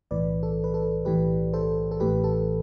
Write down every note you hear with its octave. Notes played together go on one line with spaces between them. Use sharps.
B1 A2 E3 B4 D5
A4
B4
A4
B1 A2 E3 G4 B4
A4 C5
A4
A1 A2 E3 G4 B4
A4